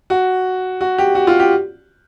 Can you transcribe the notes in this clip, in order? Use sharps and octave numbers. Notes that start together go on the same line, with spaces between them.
F#4
F#4
G4
F#4
F4
G4